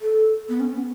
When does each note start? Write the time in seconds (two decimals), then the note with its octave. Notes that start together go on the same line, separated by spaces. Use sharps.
0.02 A4
0.49 B3
0.60 C#4
0.75 B3